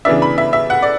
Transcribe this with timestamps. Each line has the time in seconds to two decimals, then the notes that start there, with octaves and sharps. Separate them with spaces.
0.05 C#3 E3 B3 D4 E5
0.22 B5
0.38 E5
0.53 E5
0.70 F#5
0.82 D5